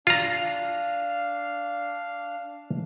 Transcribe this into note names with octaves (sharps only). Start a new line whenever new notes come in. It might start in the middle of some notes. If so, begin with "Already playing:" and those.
D4 F4 F5 A#5